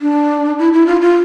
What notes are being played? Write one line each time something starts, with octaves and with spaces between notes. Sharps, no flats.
D4
E4
E4
F4
F4